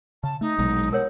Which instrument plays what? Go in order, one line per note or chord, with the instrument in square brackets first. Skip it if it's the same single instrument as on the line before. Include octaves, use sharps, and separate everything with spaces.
[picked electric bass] C#3 [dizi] A5
[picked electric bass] A3 [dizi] D#4
[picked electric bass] A#1 F#3 [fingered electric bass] B2 G#3
[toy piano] A#4 C#5 [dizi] F#5